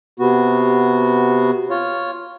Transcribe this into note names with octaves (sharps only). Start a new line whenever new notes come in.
C3 B3 F#4
F4 C#5